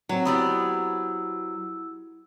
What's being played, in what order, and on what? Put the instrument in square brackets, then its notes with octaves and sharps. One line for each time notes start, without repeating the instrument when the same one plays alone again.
[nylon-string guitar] F#3 C4 [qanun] F#4
[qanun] B3 G4 D5 [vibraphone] E4 E6